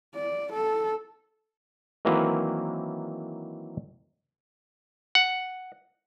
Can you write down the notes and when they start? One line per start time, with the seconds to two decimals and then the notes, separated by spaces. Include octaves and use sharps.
0.15 D5
0.53 A4
2.05 D#3 E3 F#3 A#3 C4 B4
5.15 F#5